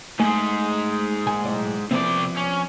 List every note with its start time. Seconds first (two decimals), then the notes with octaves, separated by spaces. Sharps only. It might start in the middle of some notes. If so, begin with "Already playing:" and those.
0.20 G#2 G#3 A3 G#5
1.26 A#2 G#5
1.45 B1 A2 D5
1.91 C3 F3 B3 C4 D5
2.37 C#4